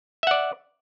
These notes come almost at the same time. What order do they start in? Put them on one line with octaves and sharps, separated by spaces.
E5 F#5 D5